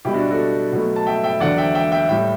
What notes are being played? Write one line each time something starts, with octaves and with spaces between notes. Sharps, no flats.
B2 G3 E4 G4
D4 F#4
F#4 A4
B2 F#3 A3
A5
E5 G5
E5 G5
E2 D3 F#3 D5 F#5
E5 G5
E5 G5
E5 G5
A2 G3 E5 G5